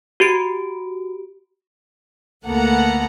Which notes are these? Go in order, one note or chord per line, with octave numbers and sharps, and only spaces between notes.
F#4 G4 D7
D2 A#3 B3 A4 F#5 A#5